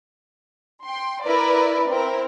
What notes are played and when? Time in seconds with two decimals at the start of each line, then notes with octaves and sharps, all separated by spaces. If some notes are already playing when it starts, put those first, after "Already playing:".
0.82 G5 C6
1.22 E4 A#4 B4 D5
1.89 C4 E4 A#4